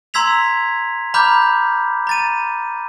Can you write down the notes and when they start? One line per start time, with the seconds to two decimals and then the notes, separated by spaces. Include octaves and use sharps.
0.14 A#5 C6 E6 G#6 B6 F7
1.14 A#5 B5 D6 F6 G6
2.07 A#5 A6 D#7